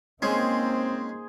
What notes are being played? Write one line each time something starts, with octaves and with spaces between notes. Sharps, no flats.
G#3 A#3 C4 C#4 D#4 G#4 C5